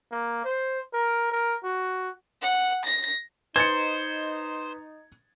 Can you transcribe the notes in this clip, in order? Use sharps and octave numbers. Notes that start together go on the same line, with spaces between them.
A#3
C5
A#4
A#4
F#4
F#5
A#6
D#4 B4 C5 D#5 C6 G#6 A6 C#7